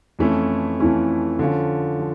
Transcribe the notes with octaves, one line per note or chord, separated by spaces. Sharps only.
F2 E3 A3 C#4 E4
F2 E3 A3 C#4 E4
D3 F3 C#4 F4
F3